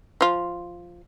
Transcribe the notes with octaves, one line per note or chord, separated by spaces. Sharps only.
F3 F4